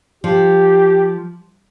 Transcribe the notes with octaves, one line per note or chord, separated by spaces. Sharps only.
F3 G4